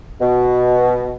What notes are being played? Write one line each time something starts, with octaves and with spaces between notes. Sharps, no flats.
B2